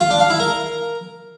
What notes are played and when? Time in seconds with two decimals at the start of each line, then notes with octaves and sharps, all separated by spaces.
0.01 F4
0.10 D4
0.20 F5
0.30 E4
0.40 A#4